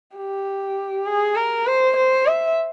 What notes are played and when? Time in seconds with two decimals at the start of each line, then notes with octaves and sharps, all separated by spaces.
0.16 G4
1.06 G#4
1.36 A#4
1.66 C5
1.96 C5
2.26 E5